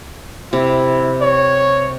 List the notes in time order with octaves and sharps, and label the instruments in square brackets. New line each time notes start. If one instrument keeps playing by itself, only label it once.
[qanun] C3 [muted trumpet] E4
[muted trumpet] C#5